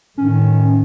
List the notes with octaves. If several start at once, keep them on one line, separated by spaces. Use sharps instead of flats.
A2 D#3 C#4